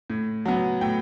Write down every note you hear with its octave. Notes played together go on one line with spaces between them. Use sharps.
A2
F#3 B3
A2 G5